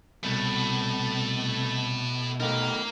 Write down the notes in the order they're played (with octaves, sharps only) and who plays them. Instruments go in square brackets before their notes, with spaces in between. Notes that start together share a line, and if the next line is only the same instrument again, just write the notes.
[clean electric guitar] C2 [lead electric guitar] B2 [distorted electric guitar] A3 E4
[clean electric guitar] A3 B3 D#4 [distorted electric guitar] A#4 F5